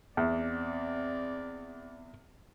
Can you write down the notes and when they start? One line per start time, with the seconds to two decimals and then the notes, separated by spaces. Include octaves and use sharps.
0.17 E2 C4 D5